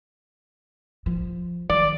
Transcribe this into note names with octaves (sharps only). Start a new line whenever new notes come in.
F3
D#3 F#3 D5